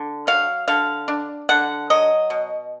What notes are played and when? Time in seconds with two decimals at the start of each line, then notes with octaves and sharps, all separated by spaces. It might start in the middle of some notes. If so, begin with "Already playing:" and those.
Already playing: D3
0.27 F#3 F5
0.68 D3 F5
1.08 D4
1.49 D3 F#5
1.90 F#3 D#5
2.30 B2